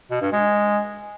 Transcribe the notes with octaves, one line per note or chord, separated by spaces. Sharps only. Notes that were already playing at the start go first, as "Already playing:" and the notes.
B2
G2
G#3